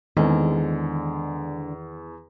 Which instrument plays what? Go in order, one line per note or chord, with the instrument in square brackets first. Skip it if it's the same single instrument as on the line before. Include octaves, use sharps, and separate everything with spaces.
[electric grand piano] E2 [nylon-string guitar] D3 G#3 C4 [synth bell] D#3